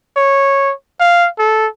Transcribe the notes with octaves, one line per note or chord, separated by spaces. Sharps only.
C#5
F5
A4